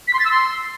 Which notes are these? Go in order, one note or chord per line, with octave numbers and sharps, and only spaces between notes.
B6
C6
A6
E6
C6